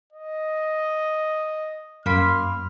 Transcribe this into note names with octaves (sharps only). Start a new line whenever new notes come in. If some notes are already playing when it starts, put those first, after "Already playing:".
D#5
F#2 A#3 B5 C6 F6